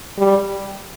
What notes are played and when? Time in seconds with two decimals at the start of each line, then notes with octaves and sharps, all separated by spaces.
0.18 G3